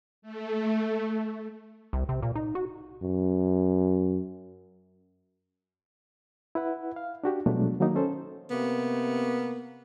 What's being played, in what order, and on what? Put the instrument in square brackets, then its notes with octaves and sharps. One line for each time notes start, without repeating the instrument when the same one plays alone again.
[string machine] A3
[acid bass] C2
C3
A#2
D#4
F#4
[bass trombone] F#2
[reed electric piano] E4 B4 F#5
F5
D4 F#4 G4
B2 F3 F#3 G#3 A3 D4
D#3 F#3 A#3 D#4
C#4 A4 C5
[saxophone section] C3 A#3 B3